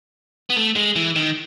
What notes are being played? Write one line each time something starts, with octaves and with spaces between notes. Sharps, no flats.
B3
A3
G#3
E3
D#3